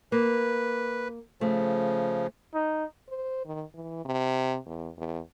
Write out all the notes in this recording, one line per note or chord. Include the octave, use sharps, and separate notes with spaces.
A#3 B4
C#3 F3 A3
D#4
C5
D#3
E3
C3
E2
E2